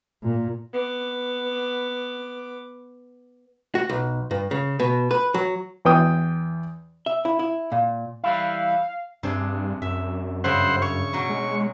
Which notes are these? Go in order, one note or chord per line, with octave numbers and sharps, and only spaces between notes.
A#2
B3 D6
F#4
B1
G2
C#3
B2
B4
F#3
E2 B3 G5 D#6
E5
E4
E4
A#2
E3 G3 E4 F5
G2 C3 D4 G#4
F#2 E5
G2 C#3 C5 E5 F#5
C#5 C#6
B2 F#3 F#4
G#3